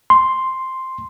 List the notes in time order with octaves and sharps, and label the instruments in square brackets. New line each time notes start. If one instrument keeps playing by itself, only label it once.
[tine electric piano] C6